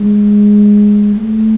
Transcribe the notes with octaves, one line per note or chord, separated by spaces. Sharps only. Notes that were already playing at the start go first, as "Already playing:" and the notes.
Already playing: G#3
A3